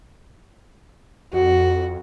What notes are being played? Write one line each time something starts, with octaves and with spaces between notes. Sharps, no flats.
F2 F#4